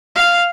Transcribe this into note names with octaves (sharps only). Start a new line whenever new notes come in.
F5